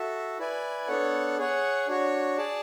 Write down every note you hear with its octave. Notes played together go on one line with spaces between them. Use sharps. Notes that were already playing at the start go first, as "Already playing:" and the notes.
Already playing: F#4 A4 E5
E4 B4 D5 G#5
B3 D4 A4 C#5 F#5
G#4 C#5 F#5
D4 F#4 C#5
G#4 D5 A5